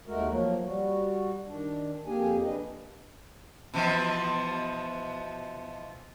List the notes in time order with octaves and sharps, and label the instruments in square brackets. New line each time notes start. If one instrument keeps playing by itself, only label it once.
[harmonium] D#2 G#3 A3 F#4 A#4
F3 F#3 A#3
G3 F#4
D#3 D4
F2 A#3 G4 G#4 G#5
D4 B4 D#5
[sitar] B2 E3 F3